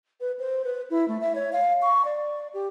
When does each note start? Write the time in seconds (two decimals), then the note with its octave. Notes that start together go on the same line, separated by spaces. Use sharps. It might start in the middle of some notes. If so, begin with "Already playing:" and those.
0.20 B4
0.39 C5
0.64 B4
0.90 E4
1.08 A3
1.21 E5
1.35 C#5
1.52 F5
1.82 C#6
2.05 D5
2.54 G4